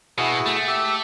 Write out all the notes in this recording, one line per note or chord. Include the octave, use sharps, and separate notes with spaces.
B2 E4 F#4 G#4
A3
G4 E5